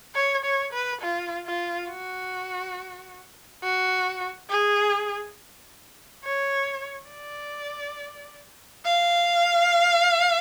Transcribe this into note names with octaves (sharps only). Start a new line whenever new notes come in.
C#5
C#5
B4
F4
F4
F#4
F#4
G#4
C#5
D5
F5